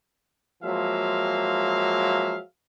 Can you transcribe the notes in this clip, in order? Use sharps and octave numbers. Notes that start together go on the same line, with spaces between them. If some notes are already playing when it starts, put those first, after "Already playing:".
F3 F#3 G#3 A#3 E5 F5